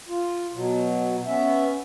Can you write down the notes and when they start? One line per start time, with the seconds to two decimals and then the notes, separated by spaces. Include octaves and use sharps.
0.09 F4
0.54 B2 F#3
1.26 B3 C#4 E5